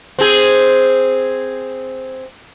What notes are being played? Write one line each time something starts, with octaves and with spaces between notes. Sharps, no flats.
C4 G#4